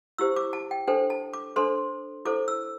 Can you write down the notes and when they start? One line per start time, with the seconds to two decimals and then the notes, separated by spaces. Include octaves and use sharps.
0.18 E4 G4 C5 E6
0.36 D6
0.53 A5
0.71 G5
0.88 D4 A4 C5 G5
1.10 A5
1.34 D6
1.56 D4 A4 C5 C6
2.25 E4 A4 C5 D6
2.48 E6